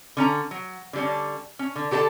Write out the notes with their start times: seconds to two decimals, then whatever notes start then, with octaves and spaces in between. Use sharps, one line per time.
0.17 D3 C#4 A#5
0.51 F#3
0.93 D3 G3 C#4
1.59 C#4
1.76 D3
1.91 D3 G4 A4 C5 A5